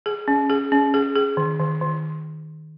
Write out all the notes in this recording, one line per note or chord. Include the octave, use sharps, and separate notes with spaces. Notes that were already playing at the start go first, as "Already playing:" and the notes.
G#4
C#4
G#4
C#4
G#4
G#4
D#3
D#3
D#3